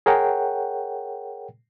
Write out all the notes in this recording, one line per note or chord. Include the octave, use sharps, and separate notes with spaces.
G#4 A#4 C#5 F#5 G5